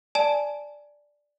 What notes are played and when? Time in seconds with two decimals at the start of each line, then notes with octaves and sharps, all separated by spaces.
0.15 D5 G#5 A5